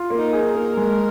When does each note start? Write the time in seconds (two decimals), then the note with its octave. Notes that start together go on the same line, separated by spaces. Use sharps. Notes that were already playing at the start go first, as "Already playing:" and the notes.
Already playing: F4
0.10 A#3
0.18 D#4
0.33 G#4
0.48 A#4
0.55 A#3
0.77 G#3